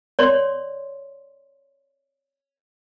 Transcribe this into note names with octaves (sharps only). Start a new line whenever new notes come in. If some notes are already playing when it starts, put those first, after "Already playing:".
C#5 D5 C6